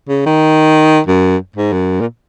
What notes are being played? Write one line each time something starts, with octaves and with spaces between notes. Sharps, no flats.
C#3
D#3
F#2
G#2
F#2
A#2